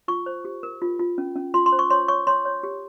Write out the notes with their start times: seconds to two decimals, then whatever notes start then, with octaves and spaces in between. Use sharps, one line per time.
0.08 F4 C#6
0.26 C5
0.45 G4
0.63 A#4
0.82 F4
0.99 F4
1.18 C#4
1.36 C#4
1.54 F4 C6
1.66 C6
1.72 C5
1.79 C#6
1.90 C#5 C6
2.08 C#5 C#6
2.27 C#5 C6
2.45 C#5
2.63 G4